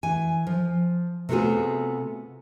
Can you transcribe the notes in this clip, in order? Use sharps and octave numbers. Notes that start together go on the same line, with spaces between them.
E3 G#5
F3
C3 A3 B3 F4 F#4 G#4